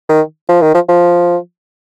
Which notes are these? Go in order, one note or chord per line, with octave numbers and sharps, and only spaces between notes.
D#3
F3
D#3
F3
F3